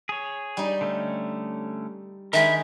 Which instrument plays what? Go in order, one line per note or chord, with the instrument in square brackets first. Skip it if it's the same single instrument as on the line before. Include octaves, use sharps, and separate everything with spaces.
[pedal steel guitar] G#4 C#5
[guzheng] G3 D#4
[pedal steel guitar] D3 A3 C#4
[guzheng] D#3 G#3 D#4 [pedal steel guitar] A#4 A#5 B5 [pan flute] E5